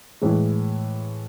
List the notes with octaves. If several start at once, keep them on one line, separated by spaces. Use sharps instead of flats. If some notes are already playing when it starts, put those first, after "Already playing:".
A2 E3 G#3